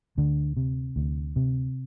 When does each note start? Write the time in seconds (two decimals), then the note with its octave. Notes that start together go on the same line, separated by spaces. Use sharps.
0.17 D2 D3
0.57 C3
0.96 D2
1.36 C3